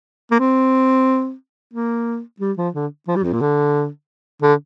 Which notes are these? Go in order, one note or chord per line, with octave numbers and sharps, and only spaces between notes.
A#3
C4
A#3
G3
F3
D3
F3
G3
F2
A#2
D3
D3